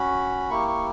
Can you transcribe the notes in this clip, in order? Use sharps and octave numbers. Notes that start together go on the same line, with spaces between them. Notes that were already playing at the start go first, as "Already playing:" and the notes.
Already playing: C#4 F#4 B5
A#3 E4 G4 C#6
C#6